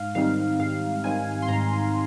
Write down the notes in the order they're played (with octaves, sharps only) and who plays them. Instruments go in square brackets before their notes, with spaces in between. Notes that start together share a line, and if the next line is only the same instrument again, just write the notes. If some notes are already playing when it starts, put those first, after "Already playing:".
Already playing: [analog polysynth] G#2 F5
D#3 G3 C4 D#4 F5
G#2 F5
D#3 G3 C4 D#4 G#5
C6
G#2 A#5